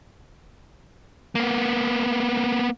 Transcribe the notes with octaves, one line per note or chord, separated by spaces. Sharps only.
A#3 B3